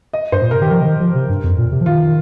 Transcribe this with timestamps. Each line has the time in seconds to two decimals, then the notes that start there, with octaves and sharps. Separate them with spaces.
0.13 D#5
0.32 G2 C5
0.42 A#2
0.51 C3 A#4
0.62 D#3 G4
0.70 F3 A#4
0.81 C3
0.85 D#3
1.00 F3
1.15 C3
1.29 G2
1.44 F2
1.58 A#2
1.72 C3
1.81 F3
1.86 D#3 F4